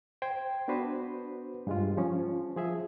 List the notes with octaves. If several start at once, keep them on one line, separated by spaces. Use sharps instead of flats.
C5 G5 G#6
B3 D4 F#4 B4 C5
G2 G#3 F4
F3 C#4
F3 G#4 E5